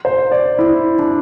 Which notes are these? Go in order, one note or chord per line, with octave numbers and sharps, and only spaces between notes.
C5
D5
E4
D4